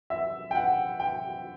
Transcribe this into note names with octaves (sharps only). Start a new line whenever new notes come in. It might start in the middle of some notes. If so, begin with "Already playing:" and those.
E5
G5
F#5
G5